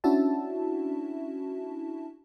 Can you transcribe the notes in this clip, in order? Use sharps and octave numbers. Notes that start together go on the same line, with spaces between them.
C#4 D4 E4 F#4 E5 A5